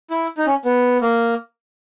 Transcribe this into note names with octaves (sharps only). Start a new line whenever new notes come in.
E4
D#4
C#4
B3
A#3